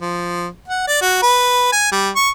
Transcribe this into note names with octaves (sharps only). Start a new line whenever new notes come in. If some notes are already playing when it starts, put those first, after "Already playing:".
F3
F#5
D5
F#4
B4
G#5
G3
C#6